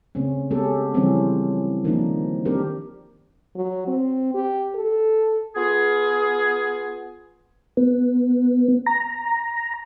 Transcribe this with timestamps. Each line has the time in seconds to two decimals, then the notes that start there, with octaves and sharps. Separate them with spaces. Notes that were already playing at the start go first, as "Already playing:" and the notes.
0.15 C#3 A3 C4 C#4
0.51 G#3 B3 C#4 G4 A4
0.94 C#3 E3 F3 G3 C4 C#4
1.84 D#3 F3 A#3 D4 D#4
2.45 D#3 C4 D4 G4 A#4
3.55 F#3
3.87 C4
4.34 G4
4.75 A4
5.56 B3 F4 G#4
7.77 B3
8.86 A#5